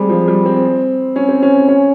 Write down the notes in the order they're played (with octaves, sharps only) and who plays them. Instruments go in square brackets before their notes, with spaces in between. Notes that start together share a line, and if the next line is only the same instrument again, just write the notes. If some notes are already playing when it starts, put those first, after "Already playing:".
Already playing: [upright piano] G3 G#3 C4
F3
G3
C4
C#4
C4
C#4
C#4